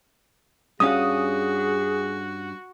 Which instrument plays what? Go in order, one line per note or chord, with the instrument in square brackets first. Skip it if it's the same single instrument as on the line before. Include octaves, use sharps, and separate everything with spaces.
[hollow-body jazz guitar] G2 C#4 F5 [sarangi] F#4 [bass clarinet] G#4 [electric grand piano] D#6